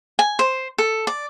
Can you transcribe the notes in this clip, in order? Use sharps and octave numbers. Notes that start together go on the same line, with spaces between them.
G#5
C5
A4
D5